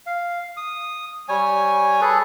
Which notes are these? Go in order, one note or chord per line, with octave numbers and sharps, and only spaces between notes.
F5
D#6
G3 C#5 G#5
G#4 A4 B4